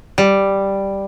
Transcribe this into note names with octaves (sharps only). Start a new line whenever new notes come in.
G3